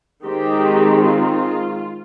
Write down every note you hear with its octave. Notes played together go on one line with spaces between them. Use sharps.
D#3 G#3 C4 G4
F4